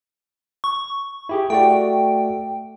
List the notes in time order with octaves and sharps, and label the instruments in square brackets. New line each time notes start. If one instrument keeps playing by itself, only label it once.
[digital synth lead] C#6
[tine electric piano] E4 G4 G#4
[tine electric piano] A3 F#4 D5 [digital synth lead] G5